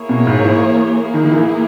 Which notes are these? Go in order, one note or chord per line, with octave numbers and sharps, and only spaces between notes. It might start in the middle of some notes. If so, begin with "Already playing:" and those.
Already playing: A#3 E4 G#4 C#5
B2
G#2
E3
A#3 E4 G#4
D#3
D#3
E3